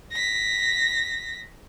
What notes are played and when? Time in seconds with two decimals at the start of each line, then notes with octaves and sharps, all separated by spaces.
0.12 A#6 B6